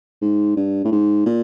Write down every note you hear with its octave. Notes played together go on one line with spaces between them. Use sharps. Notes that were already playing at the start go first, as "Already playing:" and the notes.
G#2
G2
A2
G#2
A#2